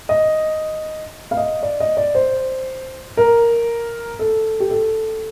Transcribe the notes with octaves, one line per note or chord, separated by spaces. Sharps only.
D#5
F5
D#5
D5
D#5
D5
C5
A#4
A4
G4
A4